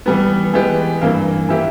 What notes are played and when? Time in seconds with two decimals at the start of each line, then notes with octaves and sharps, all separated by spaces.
0.06 E3 G3 B3
0.53 E3 G#3 B3 G4
1.01 G2 E3 A#3
1.49 E3 A#3 E4 G4